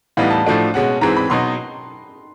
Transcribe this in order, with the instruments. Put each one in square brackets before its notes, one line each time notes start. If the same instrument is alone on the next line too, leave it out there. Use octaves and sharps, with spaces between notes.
[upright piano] A2 E3 G3 B3 D#4 [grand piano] F5
[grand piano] A5
[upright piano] A2 F3 A3 D4 F#4
B2 G#3 C#4 F#4
[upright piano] G#2 E3 G#3 C4 [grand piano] A#5
[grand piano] B5
[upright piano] B2 F#3 B3 D#4 [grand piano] C6